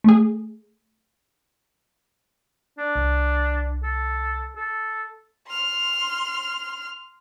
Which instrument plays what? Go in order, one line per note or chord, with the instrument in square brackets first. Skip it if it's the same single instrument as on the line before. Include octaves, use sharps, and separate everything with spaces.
[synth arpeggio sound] A3 G#4
[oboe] D4
[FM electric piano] C2
[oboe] A4
A4
[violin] C6 F6